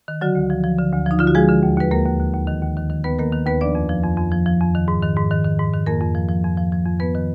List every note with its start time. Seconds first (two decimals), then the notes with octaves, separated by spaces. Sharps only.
0.08 D#3
0.21 D3 F#3 F#4
0.35 D2
0.50 F3
0.64 F3
0.79 D3
0.92 D2
1.06 F3 D#4
1.19 D3 F4
1.27 F#4
1.35 F3 G#3 G#4
1.48 D3
1.63 D#2
1.78 D#2 B4
1.91 D#2 A#3 A#4
2.06 D#2
2.20 D#2
2.34 D#2
2.47 D#3
2.62 D#2
2.77 D#3
2.90 D#3
3.04 D#2 B3 B4
3.19 D#3 A#3 A#4
3.32 D#3
3.46 D#2 B3 B4
3.61 F3 D4 D5
3.75 F2
3.89 F3
4.03 F2
4.17 F2
4.32 F3
4.46 F3
4.60 F2
4.75 D#3
4.88 G#2
5.03 D#3
5.16 G#2
5.31 D#3
5.45 D#3
5.59 G#2
5.73 D#3
5.86 F2 A#3 A#4
6.01 F2
6.15 F3
6.29 F3
6.44 F2
6.58 F3
6.72 F3
6.86 F2
7.00 F2 B3 B4
7.15 D#3